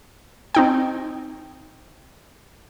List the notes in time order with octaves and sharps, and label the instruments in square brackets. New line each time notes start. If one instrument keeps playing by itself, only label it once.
[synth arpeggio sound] C4 D#4 G5